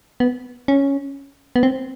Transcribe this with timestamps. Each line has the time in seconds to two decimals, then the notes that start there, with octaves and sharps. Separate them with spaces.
0.20 B3
0.68 C#4
1.56 B3
1.63 C4